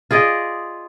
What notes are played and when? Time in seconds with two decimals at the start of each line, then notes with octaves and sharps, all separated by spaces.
0.11 F4 G#4 D5 D#5